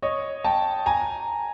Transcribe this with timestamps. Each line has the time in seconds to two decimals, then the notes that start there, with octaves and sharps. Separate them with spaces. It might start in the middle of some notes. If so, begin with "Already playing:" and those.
0.02 C#5 D#5
0.44 G5 A5
0.86 G#5 A#5